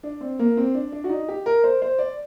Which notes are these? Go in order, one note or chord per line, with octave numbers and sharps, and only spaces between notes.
D4
C4
A#3
C4
D4
D4
F#4
D#4
G4
A#4
C5
C5
D5